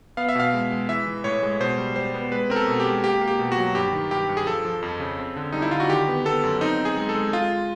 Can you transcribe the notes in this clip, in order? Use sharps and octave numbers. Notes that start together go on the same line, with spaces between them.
B3 F5
E5
B2 F5
G#3
G#3
E3 E5
E3
A2 C#5
G#3
B2 C5
G3
G3 C5
B3
G#3 B4
C4 A#4
A4
B2
G4
G#3
A#3 G4
A#3
G4
B2
F#4
F#3
G2 G4
D#3
G2 G4
G2
G#4
F3 A4
F3
F2
C#3
C4
D3
G3 D#4
E4
D3 F4
F#4
D#3 G4
B3
B3 A4
F#2
C4 D#4
C4
G#4
G#3
A4
G#3
G#3 F4